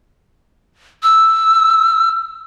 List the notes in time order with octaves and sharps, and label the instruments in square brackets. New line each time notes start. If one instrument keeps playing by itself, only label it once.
[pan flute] E6